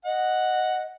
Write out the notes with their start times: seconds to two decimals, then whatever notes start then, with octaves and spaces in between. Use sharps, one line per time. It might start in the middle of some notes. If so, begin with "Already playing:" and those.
0.05 D#5 F#5